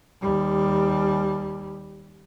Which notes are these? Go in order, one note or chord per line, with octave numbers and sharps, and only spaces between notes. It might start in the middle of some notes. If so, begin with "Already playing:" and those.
D#2 G3